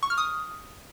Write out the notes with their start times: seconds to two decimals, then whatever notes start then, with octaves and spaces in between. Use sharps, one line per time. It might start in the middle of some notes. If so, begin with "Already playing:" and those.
0.03 C#6
0.10 F6
0.18 D#6